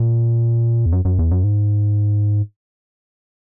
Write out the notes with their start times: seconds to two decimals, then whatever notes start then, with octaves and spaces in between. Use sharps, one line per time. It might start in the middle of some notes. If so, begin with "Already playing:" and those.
Already playing: A#2
0.86 E2
0.92 F#2
1.05 F#2
1.19 E2
1.31 F#2
1.44 G#2